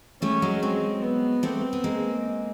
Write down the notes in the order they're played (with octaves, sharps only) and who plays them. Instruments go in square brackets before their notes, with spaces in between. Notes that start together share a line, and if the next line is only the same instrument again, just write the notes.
[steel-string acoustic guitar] G3 A3 [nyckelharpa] C#4
[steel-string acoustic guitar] F#3 G#3
[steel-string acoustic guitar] F#3 G#3 [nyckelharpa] C4
[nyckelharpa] B3
[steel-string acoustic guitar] G3 A3 [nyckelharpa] C4
[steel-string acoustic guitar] B3
G#3 A#3